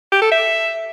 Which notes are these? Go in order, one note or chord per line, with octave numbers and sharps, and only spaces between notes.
G4
A4
E5